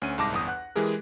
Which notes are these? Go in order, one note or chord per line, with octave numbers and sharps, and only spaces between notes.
D2 C#4 D#7
C2 G#2 A5 D6 A#6
G1 E2 D#6
F#5 F#6
E3 G#3 G4 G#4 A#4